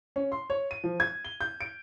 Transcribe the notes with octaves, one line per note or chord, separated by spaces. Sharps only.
C#4
C6
C#5
D#7
F3
G#6
G7
G6
D7